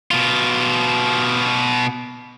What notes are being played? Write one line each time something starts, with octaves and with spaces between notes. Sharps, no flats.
B2 F4